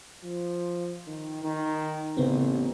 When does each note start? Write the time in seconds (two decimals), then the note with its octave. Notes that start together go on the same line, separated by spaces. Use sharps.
0.24 F3
1.07 D#3
1.44 D#3
2.17 A1 C#3 B3 C4